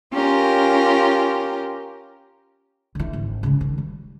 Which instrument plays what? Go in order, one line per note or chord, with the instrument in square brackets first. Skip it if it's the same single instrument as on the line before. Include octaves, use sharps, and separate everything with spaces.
[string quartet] C#4 F4 G4 A#4
[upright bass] D3 E3
G#1
C#3 G#3
D#3
G3